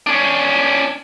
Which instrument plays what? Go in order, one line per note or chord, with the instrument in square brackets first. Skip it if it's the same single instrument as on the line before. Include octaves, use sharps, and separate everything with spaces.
[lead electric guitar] C#4 D4